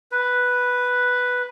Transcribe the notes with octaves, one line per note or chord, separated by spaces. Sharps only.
B4